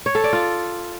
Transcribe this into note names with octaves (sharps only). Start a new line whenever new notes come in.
C#5
A4
D5
F4